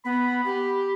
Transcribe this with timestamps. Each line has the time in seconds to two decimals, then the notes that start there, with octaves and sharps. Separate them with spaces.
0.05 B3 B5
0.46 G4